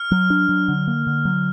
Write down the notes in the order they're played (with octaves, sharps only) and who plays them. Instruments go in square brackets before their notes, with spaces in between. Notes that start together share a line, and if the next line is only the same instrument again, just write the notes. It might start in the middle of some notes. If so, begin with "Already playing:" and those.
Already playing: [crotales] F6
[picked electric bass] F#3
D4
F#3
D3
A#3
D3
F#3